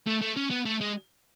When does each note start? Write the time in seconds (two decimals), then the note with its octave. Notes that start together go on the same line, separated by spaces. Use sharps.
0.07 A3
0.21 A3
0.37 C#4
0.50 B3
0.66 A3
0.81 G#3